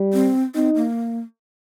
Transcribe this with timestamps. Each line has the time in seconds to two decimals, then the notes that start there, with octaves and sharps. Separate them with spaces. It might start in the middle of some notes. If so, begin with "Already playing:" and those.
Already playing: G3
0.13 C4
0.55 C4 D#4
0.75 A#3